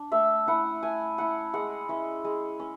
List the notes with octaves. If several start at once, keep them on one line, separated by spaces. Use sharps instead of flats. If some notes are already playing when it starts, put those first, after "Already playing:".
Already playing: D4
A3 E5
C#4 E4 F#5
A3 G#5
C#4 E4 F#5
G#3 F#5
C#4 E4
G#3
C#4